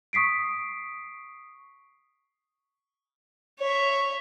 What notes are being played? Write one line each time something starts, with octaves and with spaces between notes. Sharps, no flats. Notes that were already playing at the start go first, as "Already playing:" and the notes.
C#6 D#6 B6 C7 D7
C#5 E5